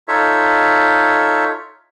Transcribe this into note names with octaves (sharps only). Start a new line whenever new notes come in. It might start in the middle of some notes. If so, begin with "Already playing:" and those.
D#4 F4 A4 C#5 E5